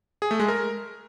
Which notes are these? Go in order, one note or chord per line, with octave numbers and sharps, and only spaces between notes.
G#4
A3
G#3
A#4